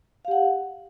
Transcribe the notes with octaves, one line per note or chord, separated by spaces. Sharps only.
G4 F5 F#5